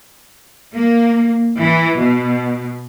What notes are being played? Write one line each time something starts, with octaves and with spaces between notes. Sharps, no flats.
A#3
E3
B2